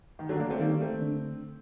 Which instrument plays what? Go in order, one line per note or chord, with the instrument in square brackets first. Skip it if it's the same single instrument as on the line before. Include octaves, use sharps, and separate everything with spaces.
[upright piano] D#3
D3 F#3
A#3 D4
A3 C4
[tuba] D#3 [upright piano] G3 A#3
[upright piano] A3 C4
[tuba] D3